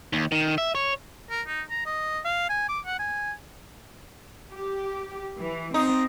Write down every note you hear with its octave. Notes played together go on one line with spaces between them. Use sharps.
D#2
D#3
E5
C#5
A#4
D#4
A#5
D#5
F5
G#5
D6
F#5
G#5
G4
E3
C4 D#4